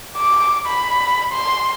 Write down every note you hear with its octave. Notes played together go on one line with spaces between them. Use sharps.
D6
B5
C6